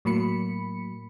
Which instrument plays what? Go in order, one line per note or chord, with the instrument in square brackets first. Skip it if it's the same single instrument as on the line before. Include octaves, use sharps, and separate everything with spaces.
[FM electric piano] A2 F#3 A#3 B5 C#7